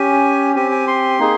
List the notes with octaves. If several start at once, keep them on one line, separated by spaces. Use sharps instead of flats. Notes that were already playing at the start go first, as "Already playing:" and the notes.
Already playing: C#4 G4 G#5
C4 G4 G#5
G#5
C6
A#3 D#4 G#4